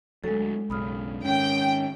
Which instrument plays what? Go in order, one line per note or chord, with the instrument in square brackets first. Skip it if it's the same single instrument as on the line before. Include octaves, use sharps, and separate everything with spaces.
[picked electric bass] D2 F#3 [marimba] G#3 A4
[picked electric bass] B1 F#2 C#3 [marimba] B5 D#6 F6
[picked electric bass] G#2 D#3 [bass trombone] C#4 [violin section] G5